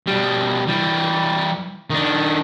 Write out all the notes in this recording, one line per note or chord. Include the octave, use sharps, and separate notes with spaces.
B2 G3
E3 G3
D#3 D4